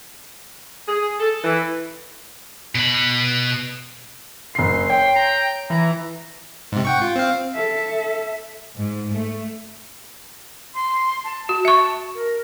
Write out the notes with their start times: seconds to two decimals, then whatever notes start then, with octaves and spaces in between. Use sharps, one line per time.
0.87 G#4
1.19 A4
1.44 E3
2.75 B2 B5
4.55 F#1 C6 C7
4.90 C#5 G5
5.16 A#5
5.70 E3 A#5
6.72 G#2 C3
6.85 F#5 G5 C#6
7.02 F4
7.16 C4 F5
7.54 A4 E5
8.77 G#2
9.11 A3
10.74 C6
11.24 A5
11.49 F#4
11.65 E5 C#6
12.14 A#4